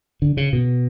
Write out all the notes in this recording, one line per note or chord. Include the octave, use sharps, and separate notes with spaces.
D3
C#3
B2